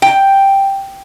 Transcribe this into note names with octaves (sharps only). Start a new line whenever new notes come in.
G5